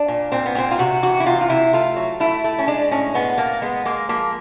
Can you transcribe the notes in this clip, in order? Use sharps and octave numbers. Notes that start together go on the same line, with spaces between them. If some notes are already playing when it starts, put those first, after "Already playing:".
Already playing: D4
A#2
A#2 C4
B3
A#2 C4
F4
C3 F#4
E3 F#4
E4
C3 F4
F4
C3 E4
A3 F4
F#3
A3 E4
A3
C#4
G#3 D4
A2 C#4
G#3 B3
A2 A#3
G#3 B3
G#3 A#3
F3 A#3